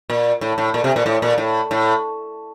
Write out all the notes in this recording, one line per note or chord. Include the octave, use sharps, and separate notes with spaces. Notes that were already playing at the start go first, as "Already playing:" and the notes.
A#2
A2
A2
A#2
C3
A#2
A2
A#2
A2
A2